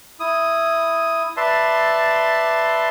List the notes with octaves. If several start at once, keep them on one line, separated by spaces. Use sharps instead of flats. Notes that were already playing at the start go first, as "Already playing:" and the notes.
E4 D#6
B4 D5 E5 A5 C6